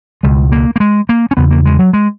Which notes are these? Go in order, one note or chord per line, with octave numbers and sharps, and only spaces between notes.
C#2 B2 G#3
A#3
A#3
G#3
A#3
C#4
E2 C#3 B3
A#3
G#3
F#3
G#3